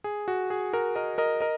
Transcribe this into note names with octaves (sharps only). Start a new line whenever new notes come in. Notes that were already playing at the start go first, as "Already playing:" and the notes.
G#4
F#4
G#4
F#4 A#4
A#4 D#5
A#4 D#5
A#4 D#5